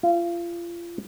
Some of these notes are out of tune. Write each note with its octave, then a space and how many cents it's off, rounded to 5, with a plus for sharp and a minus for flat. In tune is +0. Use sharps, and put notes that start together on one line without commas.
F4 -30